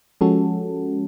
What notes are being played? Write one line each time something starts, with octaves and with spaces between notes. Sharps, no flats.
F3 G#3 C#4 F#4 A4